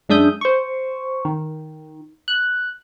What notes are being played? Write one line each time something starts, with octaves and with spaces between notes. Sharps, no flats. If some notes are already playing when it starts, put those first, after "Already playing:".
F#2 G#3 D4 E5 D#6 G6
C5 C#6
D#3
F#6